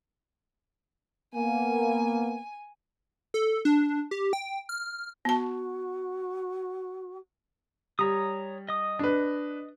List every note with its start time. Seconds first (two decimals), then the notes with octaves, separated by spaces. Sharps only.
1.35 A#3 B3 G#5
3.34 A4
3.65 D4
4.11 G4
4.33 G5
4.69 F6
5.25 B3 F#4 A5
7.99 G3 C#5 A#5 D#6
8.69 D#5 D#6
8.99 D4 B4